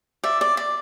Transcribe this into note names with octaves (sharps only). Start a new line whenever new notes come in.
D5 E5
D5
D5